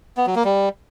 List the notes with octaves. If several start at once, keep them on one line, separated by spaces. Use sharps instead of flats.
B3
F#3
A#3
G3